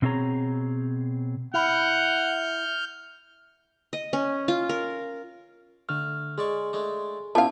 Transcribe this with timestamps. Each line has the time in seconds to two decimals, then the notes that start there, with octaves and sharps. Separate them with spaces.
0.02 B2 C4 D#4 G#4 C#5 A#5
1.54 E4 F#5 F6 G6
3.93 D#5
4.13 C#4
4.48 F4
4.69 A#4
5.89 D3 A3 F6
6.38 G#3 G#4 D5 C#6
6.73 G#3 A3 D4
7.35 B2 B3 C#4 E4 F4 F5 A5